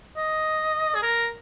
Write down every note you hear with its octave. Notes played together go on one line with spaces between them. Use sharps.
D#5
G#4
A#4